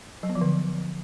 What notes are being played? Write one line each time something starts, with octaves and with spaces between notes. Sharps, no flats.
F#3
B3
F3
D3